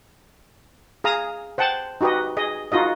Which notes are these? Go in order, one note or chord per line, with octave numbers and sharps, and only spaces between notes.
G#4 F5 A#5 D#6
C5 F#5 G5 A5
D#4 F#4 G4 B4 D#5
G#4 D#5
D#4 F4 F#4 D#5